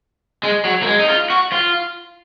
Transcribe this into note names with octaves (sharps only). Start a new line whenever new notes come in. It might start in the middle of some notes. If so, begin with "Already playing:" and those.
G#3
F#3
A#3
G#3
D#4
F4
F#4
F4